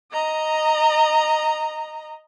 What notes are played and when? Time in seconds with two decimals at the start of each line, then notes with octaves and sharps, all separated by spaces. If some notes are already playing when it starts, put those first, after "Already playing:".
0.12 D#5 A#5